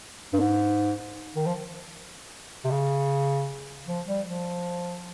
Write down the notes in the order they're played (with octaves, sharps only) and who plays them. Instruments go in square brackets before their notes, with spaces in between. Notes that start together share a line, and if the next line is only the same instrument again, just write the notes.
[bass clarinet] G2
G#2
D#3
F3
C3
C#3
F3
G3
F3